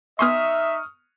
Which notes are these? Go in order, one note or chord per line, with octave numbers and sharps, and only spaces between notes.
B3 D#4 E5 G#5 C6 C#6 D#6 F6